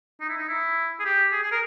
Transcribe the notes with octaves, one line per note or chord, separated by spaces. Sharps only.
D#4
E4
D#4
E4
G#4
G4
G#4
G#4
A#4